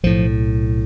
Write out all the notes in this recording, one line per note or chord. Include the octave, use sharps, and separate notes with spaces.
B1 A2 F3